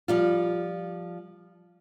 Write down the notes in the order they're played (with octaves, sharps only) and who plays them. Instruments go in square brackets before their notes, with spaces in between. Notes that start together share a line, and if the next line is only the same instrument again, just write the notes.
[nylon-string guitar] F3 G3 F4